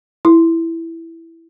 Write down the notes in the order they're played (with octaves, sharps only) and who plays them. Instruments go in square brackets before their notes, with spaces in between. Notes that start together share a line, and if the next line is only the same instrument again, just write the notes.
[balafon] E4